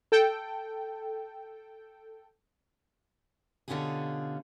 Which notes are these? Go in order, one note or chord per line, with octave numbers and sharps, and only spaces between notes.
A4 G5
B2 D3 C#4 F4 G4 G#4